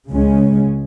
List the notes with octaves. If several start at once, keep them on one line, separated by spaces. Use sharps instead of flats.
C#2 C#3 G#3 C#4